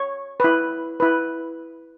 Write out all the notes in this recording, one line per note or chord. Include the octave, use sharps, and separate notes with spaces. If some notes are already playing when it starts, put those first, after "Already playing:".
Already playing: C#5
E4 B4
E4 B4